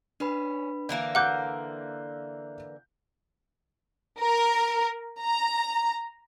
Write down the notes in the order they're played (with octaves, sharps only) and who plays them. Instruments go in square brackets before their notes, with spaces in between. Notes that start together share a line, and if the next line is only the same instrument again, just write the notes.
[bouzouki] C#4 [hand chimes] D4 B4 B5
[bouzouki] D3 E3 A#3 [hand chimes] D5
[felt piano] F5 F#6 G6 [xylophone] F#5 D6
[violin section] A#4
A#5